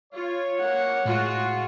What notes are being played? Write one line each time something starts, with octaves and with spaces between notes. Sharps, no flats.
F4 C#5
A#3 F#5
A2 G#3 F4 F#4